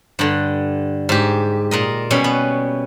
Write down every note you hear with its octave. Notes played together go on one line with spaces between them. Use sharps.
G2 D3
G#2 G4
A#2 A#4 D#5
B2 G3 C#4
B3